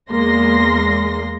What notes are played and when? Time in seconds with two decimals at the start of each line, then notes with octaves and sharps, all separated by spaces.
0.10 E2 G#3 A#3 C6 A#6